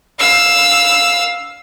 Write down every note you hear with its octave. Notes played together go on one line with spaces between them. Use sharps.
F5 E6